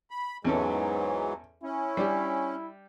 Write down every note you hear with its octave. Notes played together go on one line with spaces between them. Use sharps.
B5
E2 G#2 E3 F#3 G#3 C#4 A4
C#4 E4
G3 D4 G4